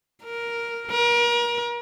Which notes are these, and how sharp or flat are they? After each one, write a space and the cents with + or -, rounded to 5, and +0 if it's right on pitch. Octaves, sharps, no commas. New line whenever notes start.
A#4 +5
A#4 +35